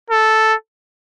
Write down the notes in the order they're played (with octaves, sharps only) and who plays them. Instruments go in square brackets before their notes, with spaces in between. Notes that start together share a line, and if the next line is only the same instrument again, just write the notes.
[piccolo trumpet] A4